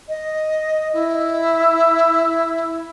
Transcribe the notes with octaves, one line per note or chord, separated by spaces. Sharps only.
D#5
E4